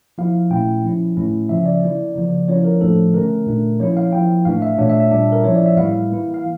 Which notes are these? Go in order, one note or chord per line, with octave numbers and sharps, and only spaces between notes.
F3 A#3 E4 F5
A#2 A3 C#4 E4 G5
F3 C#4 E4
A2 E3 A3 C#4 E4
C#3 F3 C#4 E5
D5
E3 A#3 E4
C#3 F3 A#3
F3 A#3 C#4 E4 C#5
A#4
A2 F3 A3 D4 A4
D3 A3 C#4 A#4
A#2 A3 D4
F3 A#3 C#4 E4 C#5
F5
F3 A#3 E4 G5
A2 E3 A3 D4 F5
E5
A#2 A3 D4 C#5
E5
E5
A#2 G3 D4
A#4
F3 C#4 E4 C#5
D5
E5
A2 E3 G3 A#3 E4 F5
E3 A#3 E4
F5